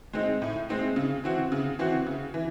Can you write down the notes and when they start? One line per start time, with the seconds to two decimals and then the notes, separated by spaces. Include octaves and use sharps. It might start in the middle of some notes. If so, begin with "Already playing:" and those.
0.13 G#3 C4 D#4
0.42 A2
0.69 G#3 C4 D#4
0.96 C#3
1.24 E3 C4 F#4
1.52 C#3
1.79 E3 C4 F#4
2.07 C#3
2.34 E3